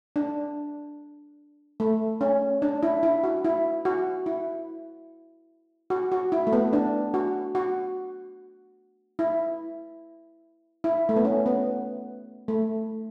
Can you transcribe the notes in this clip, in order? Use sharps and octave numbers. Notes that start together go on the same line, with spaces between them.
D4
A3
C#4
D4
E4
E4
F#4
E4
F#4
E4
F#4
F#4
E4
A3
B3
D4
F#4
F#4
E4
E4
A3
B3
C#4
B3
A3